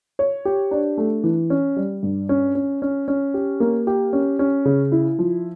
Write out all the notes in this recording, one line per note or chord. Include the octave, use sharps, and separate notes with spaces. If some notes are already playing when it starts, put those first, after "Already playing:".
C#5
G4
D4
A3
E3
C#4
G3
G2
C#4
C#4
C#4
C#4
G4
A#3
G4
C#4
C#4
C#3
E4
F3